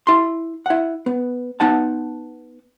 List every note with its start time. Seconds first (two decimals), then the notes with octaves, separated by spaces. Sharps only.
0.07 E4 C6
0.66 E4 F#5
1.06 B3
1.60 B3 D#4 F#5 A5